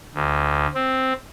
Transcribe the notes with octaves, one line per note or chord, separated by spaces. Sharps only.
D2
C4